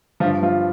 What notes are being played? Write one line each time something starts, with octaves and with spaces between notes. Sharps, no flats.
G1 G2 D3 F3 F4
F3 F4